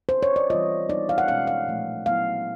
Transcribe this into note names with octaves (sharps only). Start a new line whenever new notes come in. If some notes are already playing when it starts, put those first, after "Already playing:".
C5
C#5
D5
E3 G3 C4 F4 D#5
G3 B3 D#4 D5
F5
F#5
B2 G#3 C#4 F5
F5
A#2 F3 A3
F#3 B3 E4 F5